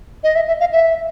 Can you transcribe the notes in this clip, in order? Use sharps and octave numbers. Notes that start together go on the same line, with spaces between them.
D#5
E5
E5
F5
E5